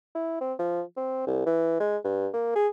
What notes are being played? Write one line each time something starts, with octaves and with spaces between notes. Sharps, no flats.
E4
C4
F3
C4
C2
E3
G#3
G2
A#3
G#4